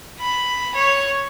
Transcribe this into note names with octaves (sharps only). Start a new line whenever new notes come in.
B5
C#5